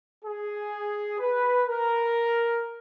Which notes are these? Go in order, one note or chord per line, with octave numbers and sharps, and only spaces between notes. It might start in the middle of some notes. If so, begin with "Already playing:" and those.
G#4
B4
A#4